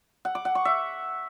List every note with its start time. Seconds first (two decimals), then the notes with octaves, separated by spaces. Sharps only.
0.25 F#5
0.35 D6
0.45 F#5
0.55 C#6
0.65 E5